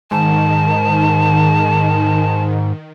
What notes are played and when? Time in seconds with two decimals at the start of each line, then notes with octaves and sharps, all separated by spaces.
0.11 G#2 D#3 A5